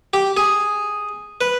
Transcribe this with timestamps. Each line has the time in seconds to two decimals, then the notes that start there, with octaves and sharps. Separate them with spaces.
0.13 G4
0.37 G#4
1.41 B4